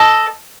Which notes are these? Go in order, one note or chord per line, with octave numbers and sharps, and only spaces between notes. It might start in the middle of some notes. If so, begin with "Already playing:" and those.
Already playing: A4 D#5 A5